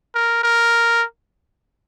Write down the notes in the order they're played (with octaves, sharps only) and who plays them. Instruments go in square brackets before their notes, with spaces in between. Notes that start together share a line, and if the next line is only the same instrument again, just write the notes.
[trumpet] A#4
A#4